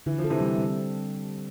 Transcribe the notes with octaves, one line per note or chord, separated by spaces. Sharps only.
D3 E3
F3
A4
C3 E3
G3
C4